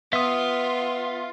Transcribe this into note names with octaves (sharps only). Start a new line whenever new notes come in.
B3 F4 E5 D#6